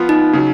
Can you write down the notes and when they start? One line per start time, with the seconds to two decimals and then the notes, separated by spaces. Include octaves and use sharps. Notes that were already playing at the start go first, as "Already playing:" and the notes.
Already playing: F3 B3 F4
0.09 D#4
0.33 C#3 F#3